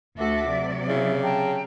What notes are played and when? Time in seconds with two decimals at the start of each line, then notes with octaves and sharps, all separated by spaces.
0.17 D2 F#4 A4 E5 D6
0.48 C3 F#3 D5
0.89 C#3 E4 E5
1.22 G5 A5 A#5